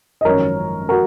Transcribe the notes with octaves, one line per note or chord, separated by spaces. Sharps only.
D#5
G#1 F#2 F3 A#4 C#5
F#4 A#4